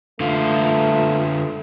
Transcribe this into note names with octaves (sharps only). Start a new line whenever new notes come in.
D3 A3 F4